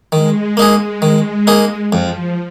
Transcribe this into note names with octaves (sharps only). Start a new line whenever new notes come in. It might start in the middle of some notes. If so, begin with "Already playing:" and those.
D#3 G#3
A#3 D#4 G#4
D#3
A#3 D#4 G#4
F2 F3